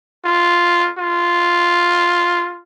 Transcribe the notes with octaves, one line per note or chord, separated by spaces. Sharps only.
F4
F4